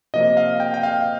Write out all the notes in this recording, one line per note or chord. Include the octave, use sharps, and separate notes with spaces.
C3 F3 A#3 D#5
F5
G5
G5
F5